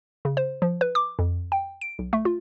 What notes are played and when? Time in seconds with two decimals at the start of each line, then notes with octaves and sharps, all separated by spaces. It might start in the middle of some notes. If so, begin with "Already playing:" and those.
0.25 C#3
0.37 C5
0.62 F3
0.81 B4
0.95 D6
1.19 F2
1.52 G5
1.81 D7
1.99 B1
2.13 A3
2.25 F4